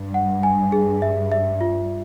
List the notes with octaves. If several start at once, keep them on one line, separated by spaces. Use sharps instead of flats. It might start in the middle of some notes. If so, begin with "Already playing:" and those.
Already playing: G2
F#5
G#5
G#4
E5
E5
F4